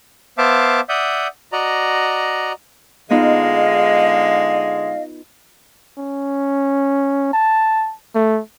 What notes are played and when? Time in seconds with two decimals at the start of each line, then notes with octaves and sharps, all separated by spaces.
0.38 B3 C5 E5 F5 A5 D6
0.89 D5 E5 F#5 D#6 G6
1.52 F#4 D5 D#5 A#5
3.10 D3 G#3 B3 D#4 F4 D#5 F5
5.99 C#4
7.33 A5
8.15 A3